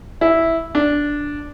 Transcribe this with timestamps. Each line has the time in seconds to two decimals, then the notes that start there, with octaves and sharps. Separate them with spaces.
0.21 E4
0.75 D4